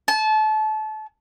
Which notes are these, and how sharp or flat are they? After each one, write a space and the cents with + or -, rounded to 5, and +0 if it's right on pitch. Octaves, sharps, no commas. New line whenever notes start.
A5 -30